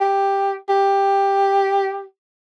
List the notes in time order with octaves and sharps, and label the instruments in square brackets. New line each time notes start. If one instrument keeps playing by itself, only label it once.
[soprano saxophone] G4
G4